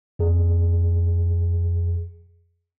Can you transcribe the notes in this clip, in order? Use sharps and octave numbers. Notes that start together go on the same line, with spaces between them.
F2 G#4